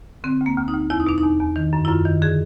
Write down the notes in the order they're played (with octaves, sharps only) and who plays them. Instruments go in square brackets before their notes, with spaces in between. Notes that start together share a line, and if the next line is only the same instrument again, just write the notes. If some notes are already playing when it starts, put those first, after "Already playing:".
[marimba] D3 C4
D2
A#3
D2
D#4
D2
E2 E4
D#4
B2 D4
D#4
E2
E2
D#3
F#2
E4
F#2 F4
D#3
D3 G#4